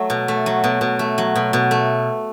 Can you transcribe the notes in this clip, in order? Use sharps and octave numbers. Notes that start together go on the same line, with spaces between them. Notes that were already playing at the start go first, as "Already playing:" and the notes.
Already playing: F#3 A3
B2
A3
F#3
B2
B2
A3
F#3
B2
B2
A3